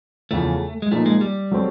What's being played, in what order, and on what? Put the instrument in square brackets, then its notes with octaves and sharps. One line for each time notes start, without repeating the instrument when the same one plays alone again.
[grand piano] E2 C#3 F3 [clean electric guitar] A3
[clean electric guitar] G#3
[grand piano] A#2 F3 A#3 D#4 [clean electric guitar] A3
[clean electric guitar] G#3
G3
[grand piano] F#3 A3 C4